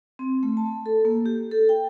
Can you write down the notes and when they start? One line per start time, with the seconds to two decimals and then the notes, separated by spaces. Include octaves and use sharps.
0.19 C4
0.43 A3
0.57 A5
0.86 A4
1.05 A#3
1.26 G4
1.51 A4
1.69 G5